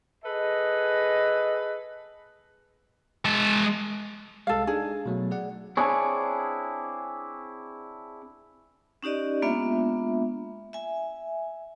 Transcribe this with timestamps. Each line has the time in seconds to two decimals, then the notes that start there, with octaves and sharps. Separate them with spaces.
0.24 G#4 A4 B4 D#5
3.25 G#3 A5
4.47 C2 G#3 A4 F5
4.67 D4 D#4 G#4
5.06 B2 F#3 A3
5.31 G#4 D5 F#5
5.77 C4 D4 E4 G#4 C#5
9.03 C#4 D#4 G4 D5 D#5
9.42 G#3 A#3 B3 D4 F4 E5
10.73 E5 G#5